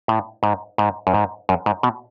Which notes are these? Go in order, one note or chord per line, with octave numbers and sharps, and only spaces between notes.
A2
G#2
G#2
F#2
G#2
F#2
G#2
B2